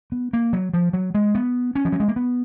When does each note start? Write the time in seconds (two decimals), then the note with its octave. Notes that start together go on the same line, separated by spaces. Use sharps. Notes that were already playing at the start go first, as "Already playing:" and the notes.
0.12 B3
0.33 A#3
0.53 F#3
0.74 F3
0.93 F#3
1.15 G#3
1.35 B3
1.75 C#4
1.85 F3
1.92 F#3
2.00 G#3
2.08 A#3
2.16 B3